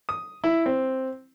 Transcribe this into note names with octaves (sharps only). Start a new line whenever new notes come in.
D#6
E4
C4